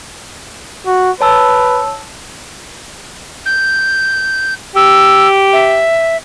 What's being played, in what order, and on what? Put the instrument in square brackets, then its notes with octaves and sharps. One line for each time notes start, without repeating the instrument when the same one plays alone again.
[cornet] F#4
[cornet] B4 [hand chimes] C#5 A5 E6
[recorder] G6
[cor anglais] G4 [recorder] E6
[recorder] E5